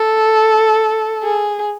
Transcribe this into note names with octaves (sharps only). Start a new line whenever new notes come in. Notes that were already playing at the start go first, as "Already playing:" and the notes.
Already playing: A4
G#4